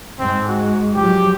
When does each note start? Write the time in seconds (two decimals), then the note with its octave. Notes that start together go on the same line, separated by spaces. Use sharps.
0.19 G#2 G#3 C4
0.48 F#4
0.95 G#2 F3 F#3 G4